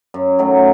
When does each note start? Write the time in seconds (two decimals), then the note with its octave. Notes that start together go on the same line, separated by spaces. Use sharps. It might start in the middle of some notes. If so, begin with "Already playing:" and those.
0.14 F#2
0.39 D#3 F#3 A3